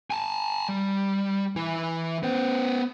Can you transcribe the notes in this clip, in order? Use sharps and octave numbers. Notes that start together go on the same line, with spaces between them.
G#5 A5
G3
E3 E4
B3 C5